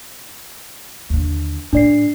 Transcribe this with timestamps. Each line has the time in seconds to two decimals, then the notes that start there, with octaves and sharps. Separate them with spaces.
1.10 D#2 D3
1.73 A2 D4 D5 C7